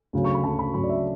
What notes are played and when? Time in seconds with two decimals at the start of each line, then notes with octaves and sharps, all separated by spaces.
0.13 D2 C#3 F#3
0.24 C#6
0.34 B5
0.44 D2 C#3 F#3 A5
0.59 B5
0.74 D2 C#3 F#3 B5
0.84 D5
0.89 E5